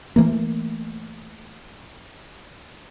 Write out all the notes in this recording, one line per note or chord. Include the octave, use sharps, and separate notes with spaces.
E3 A3 A#3